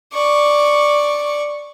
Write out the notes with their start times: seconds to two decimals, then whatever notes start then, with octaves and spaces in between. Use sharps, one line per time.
0.13 D5 C#6